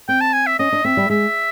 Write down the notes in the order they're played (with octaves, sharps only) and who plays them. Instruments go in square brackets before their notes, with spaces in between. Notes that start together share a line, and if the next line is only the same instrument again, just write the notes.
[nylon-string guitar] C4 [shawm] G5
[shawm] A5
G#5
E5
[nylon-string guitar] C#4 [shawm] D#5
[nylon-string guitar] D4
[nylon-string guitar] C4 [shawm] E5
[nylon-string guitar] G3
[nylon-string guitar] G#3 [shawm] E5